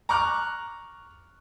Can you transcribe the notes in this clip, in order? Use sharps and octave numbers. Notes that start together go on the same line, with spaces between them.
A#5 C#6 D6 F6 F#6